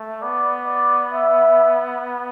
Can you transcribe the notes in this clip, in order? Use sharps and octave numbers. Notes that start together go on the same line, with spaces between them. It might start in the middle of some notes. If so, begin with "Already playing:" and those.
Already playing: A3
B3 D5
D5
E5